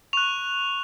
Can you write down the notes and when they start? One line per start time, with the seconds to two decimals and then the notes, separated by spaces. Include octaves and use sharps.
0.13 C#6 F#6 F7